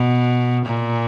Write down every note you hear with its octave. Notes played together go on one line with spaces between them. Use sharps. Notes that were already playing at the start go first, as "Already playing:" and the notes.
Already playing: B2
A#2